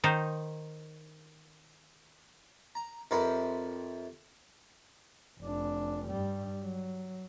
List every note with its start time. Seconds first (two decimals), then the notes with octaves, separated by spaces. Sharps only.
0.04 D#3 D#4 C5
2.75 A#5
3.11 F2 C3 A#4 B4 B5 C6
5.41 F1 D4
6.08 G2 G3
6.63 F#3